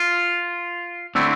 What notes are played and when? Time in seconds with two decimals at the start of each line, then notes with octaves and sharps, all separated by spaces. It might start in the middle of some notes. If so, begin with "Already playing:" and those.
Already playing: F4
1.15 D3 A3 C4 E4